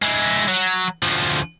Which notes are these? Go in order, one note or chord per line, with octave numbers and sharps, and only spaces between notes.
G#3 E4
F#3
D2 F3